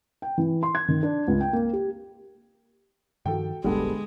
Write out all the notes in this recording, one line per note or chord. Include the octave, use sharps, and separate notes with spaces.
G5
E3
C6
G#6
D#3
D4
C#2
G5
A#3
G4
G2 D#3 F3 F#4 A4 G5
E1 A1 D3 G3 G#3 B3 A4